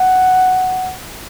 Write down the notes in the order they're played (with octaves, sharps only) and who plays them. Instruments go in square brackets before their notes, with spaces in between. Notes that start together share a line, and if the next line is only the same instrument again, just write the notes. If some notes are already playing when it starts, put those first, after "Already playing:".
Already playing: [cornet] F#5